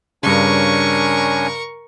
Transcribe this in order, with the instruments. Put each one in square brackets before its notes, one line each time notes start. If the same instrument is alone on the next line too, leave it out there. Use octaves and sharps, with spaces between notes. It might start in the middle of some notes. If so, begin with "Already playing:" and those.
[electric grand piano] G2 C#3 [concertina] C#4 D4 G#5 [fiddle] A#4 C#6